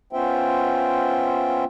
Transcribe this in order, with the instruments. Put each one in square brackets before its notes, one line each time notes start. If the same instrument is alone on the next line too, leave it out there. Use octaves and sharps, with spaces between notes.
[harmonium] B3 C#4 F4 C5 E5 G5